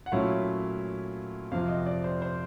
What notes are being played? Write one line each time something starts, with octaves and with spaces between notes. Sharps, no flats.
F#5
A#2 F#3 A3 C#4 E4 F5
F2 C3 F3 F5
D#5
D5
C5
C5